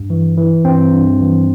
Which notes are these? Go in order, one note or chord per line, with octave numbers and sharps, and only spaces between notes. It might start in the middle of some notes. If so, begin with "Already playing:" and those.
Already playing: G2
E3
E3
G2 C4
G2
E3